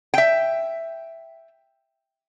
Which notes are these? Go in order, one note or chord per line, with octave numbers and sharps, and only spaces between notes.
E5 G5